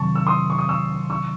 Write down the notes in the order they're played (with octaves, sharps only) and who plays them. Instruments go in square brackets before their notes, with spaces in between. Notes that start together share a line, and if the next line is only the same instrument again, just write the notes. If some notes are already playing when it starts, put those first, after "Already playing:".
Already playing: [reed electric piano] C3 D#3 F#3 [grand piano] A5 C#6
[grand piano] E6
C6 D#6
C#6
D#6
C#6 E6
C#6 E6